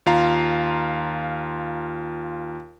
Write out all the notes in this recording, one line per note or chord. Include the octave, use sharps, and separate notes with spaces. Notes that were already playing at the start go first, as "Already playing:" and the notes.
D#2 F4 F5 A#5